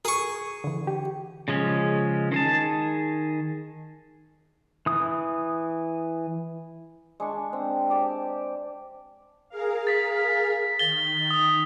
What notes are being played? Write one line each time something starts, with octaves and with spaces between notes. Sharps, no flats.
G#4 A#4 C#6
D3 E3
G4
C#3 F3 G#3 C#4
D#3 G#4 A5
E3 D#6
G#3 D4 C#6
C4
G4 D5 A5
G#4 A#4 F5
A6 B6
D#3 A6 G7
D#6